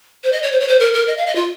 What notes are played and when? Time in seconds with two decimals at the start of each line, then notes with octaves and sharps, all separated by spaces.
0.24 C5
0.32 D#5
0.43 C#5
0.52 C5
0.60 C#5
0.68 C5
0.80 A#4
0.93 A#4
1.08 D#5
1.18 F5
1.27 D#5
1.36 F4